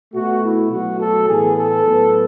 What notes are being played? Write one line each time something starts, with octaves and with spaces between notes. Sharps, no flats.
B2 A3 F#4
E4
B2 F#3 A3 F#4
A4
A2 E3 B3 G#4
A4
A2 F#3 B3